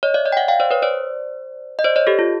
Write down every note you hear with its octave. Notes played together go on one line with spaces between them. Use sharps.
C#5 D#5
D5 E5
C#5 D#5
G5
E5 F#5
F5 G5
C5 D5
B4 C#5
C5 D5
D#5
C5 D5
C#5 D#5
G4 A4
F4